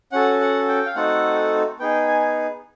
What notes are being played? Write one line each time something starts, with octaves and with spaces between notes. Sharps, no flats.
C#4 F#4 A4 F#5
F#5
G5
F5
A3 C4 D#4 F#4 A4 F#5
B3 D#4 G#4 G5
G#5